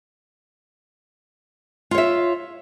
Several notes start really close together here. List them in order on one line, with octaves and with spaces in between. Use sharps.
F4 C#5 E5